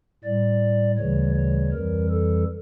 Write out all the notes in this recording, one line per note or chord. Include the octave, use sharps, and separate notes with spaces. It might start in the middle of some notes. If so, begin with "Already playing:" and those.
A2 G3 D5
D2 C#3 E3 G3 C#5
C#5
F2 E3 G3 A#4
A4